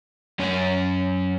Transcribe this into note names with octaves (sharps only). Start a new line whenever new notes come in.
F#2 C#4